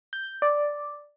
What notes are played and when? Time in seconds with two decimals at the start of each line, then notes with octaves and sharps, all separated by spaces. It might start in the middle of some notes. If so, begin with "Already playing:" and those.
0.13 G6
0.42 D5